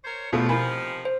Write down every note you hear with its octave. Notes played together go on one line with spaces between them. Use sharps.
A#4 C5 C#5
E2 B2 F3 A3 E4 F4
C3 D#3 F3 E4 A#4 G#5 B5
C5